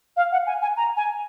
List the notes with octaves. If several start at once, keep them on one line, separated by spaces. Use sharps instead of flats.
F5
F#5
G#5
G#5
A#5
G#5